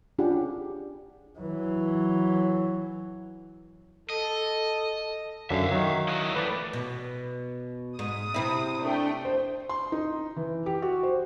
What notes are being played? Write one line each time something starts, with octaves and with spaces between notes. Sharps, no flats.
C#4 D4 F4 G4 G#4 F#5
E3 F#3
A4 D#5
F#2 D3 E5 F5
D#3 F#3
E4 F#4 D#5
E3 A3 B4 D5
B2
G#2 D#6
C3 C4 E4
A3 D4 G5
C5
C6
D#4
E3
G4
F#4
C5